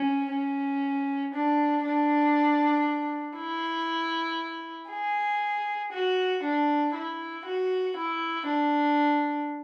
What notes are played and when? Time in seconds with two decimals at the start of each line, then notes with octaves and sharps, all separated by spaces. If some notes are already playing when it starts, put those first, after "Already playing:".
Already playing: C#4
0.31 C#4
1.34 D4
1.84 D4
3.36 E4
4.90 G#4
5.92 F#4
6.43 D4
6.94 E4
7.45 F#4
7.96 E4
8.47 D4